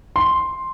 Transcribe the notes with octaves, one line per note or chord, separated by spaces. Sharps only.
C6